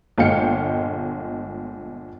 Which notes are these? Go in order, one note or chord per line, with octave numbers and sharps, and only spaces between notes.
G1 A#2 G#3 F5 G5 C#7